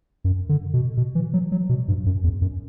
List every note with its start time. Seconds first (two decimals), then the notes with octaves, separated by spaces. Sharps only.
0.24 F#2
0.49 D3
0.74 B2
0.97 B2
1.15 E3
1.33 F#3
1.52 F#3
1.69 B2
1.88 G2
2.06 F#2
2.24 E2
2.42 F#2